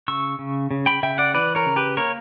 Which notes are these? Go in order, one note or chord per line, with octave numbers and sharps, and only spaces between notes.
C#3 C#6 E6
C#3
C#3
G5 B5
C#3 E5 G5
D5 F#5
E3 B4 D5
A#4 C#5
C#3
G4 B4
A#3 A#4 C#5